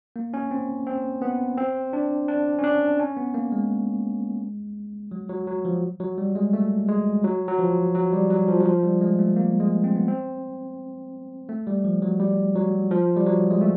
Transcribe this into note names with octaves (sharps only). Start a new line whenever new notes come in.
A#3
C#4
C4
C4
B3
C4
D4
D4
C#4
D4
C#4
B3
A#3
G#3
F#3
F#3
F#3
F3
F#3
G3
G#3
A3
G#3
F#3
F#3
F3
F#3
G3
F#3
F3
F#3
F3
G3
G#3
A3
A#3
G#3
C4
B3
C4
A3
G3
F3
F#3
G3
F#3
F3
G3
F#3
G#3
A3